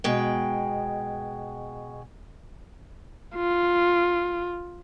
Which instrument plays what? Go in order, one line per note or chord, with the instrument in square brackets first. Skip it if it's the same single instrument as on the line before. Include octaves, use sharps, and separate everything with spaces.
[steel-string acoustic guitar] B2 G#3 G5
[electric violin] F4